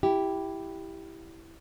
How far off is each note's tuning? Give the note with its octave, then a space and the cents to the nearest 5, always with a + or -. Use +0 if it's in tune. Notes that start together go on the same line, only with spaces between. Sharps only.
E4 +0 G4 -5